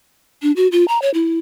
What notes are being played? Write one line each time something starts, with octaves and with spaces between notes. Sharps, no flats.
D4
F#4
F4
A#5
C#5
E4